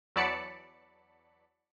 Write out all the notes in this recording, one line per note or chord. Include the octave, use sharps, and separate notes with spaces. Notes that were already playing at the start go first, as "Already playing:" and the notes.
E2 F#3 D5 A5 B5 C#7